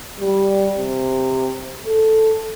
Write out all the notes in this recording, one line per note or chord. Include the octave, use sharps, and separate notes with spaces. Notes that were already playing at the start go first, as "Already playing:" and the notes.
G3
C3
A4